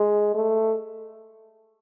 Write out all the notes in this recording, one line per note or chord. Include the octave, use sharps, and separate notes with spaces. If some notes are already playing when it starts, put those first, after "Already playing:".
Already playing: G#3
A3